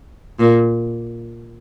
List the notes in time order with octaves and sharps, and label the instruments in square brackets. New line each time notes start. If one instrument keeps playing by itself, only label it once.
[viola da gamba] A#2